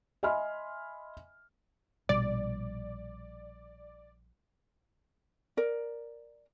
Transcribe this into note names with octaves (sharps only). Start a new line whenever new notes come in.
D#5 E5 G#5 B5 C6 F6
A#1 B2 G3 D5
A#4 D5